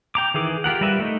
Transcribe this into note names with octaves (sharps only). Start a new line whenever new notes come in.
G5 A#5 D6
D#3 E3 G#4 D6
F4 G4 A#4 F#5
G3 A#4 B4 E5
A3 D#4